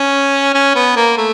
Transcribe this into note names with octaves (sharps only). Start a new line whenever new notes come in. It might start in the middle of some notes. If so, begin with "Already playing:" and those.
Already playing: C#4
C#4
B3
A#3
A3